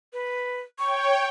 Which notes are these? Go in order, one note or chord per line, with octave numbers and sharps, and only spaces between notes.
B4
C#5 G5 C#6